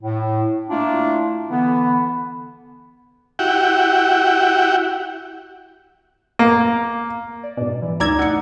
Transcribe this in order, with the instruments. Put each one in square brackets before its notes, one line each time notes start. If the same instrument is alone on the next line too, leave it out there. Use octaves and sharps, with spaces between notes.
[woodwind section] A2
A3 A#3 D4 E4 F4
D3 E3 B3
[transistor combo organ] E4 F#4 G4 F#5 G5
[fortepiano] A#3
[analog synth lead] D5
[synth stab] G#2 B2
[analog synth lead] E3
[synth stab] D2 D5 G#6 [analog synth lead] D#4 [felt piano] A#5 E6
[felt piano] D#4 C#7 [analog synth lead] F#5